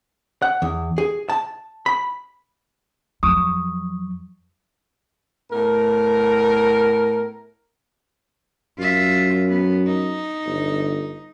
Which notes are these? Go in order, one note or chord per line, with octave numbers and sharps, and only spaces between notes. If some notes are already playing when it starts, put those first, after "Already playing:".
F#5
E2
G#4
A5
B5
F2 F#3 C#6 D#6
A2 B3 A#4
F#2 F4 E5
B3
D#4
G1